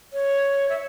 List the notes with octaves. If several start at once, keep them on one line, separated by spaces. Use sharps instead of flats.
C#5
E5